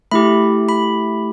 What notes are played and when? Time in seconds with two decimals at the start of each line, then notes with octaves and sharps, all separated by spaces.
0.11 A3 E4 G4 B5
0.69 B5